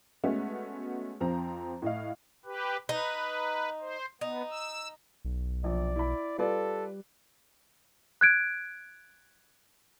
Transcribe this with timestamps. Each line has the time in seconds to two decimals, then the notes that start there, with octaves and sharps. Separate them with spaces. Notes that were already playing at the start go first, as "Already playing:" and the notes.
0.24 G#3 A3 B3 C#4 F#4
1.20 F2 F3 C4 C5 A#5
1.82 A2 D#5 F5
2.45 G4 B4
2.89 D#4 B4
3.80 C5
4.21 B3 D#4
4.51 E6
5.25 B1
5.64 A#1 D5
5.96 E4 B5
6.38 G3 F4 A4 B4 D5
8.21 F#6 G#6 D7